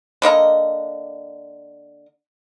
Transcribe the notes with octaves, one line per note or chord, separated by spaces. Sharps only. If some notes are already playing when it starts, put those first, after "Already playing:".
D3 A#3 D#5 A#5